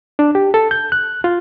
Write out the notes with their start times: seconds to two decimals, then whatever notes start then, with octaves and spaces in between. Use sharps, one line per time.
0.19 D4
0.35 G4
0.54 A4
0.71 G6
0.92 F#6
1.24 F4